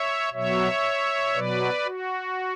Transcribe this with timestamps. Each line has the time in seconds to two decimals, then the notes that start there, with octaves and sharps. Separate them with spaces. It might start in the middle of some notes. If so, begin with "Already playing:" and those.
Already playing: C#5 E5
0.33 B2 F#3 C#5 E5
1.34 B2 F#3 B4 D5
1.85 F#4